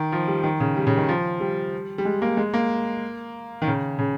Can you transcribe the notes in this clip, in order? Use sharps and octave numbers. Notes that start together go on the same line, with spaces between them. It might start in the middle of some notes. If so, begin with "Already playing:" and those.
Already playing: D#3
F3
G3
D#3
C#3
G3
C#3
D#3
F3
G3
G3
G#3
A#3
G#3
A#3
D#3
C#3
C#3